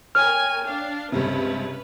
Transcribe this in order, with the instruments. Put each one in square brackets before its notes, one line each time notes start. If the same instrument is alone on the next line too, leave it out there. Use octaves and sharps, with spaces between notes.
[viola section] A#4 G#5 [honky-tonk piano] C#5 G5 [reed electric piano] F6
[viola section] D4 F5
[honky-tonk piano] C#2 G2 C3 [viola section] C#4 B4